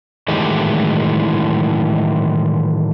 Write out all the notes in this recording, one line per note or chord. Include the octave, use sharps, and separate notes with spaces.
A2 D#3 E3 F#3 G#3 G4